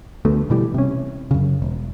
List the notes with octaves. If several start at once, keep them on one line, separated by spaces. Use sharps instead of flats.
D2 A3 B3
B2 E3 G3
C3 C#4
F#2 C#3
E1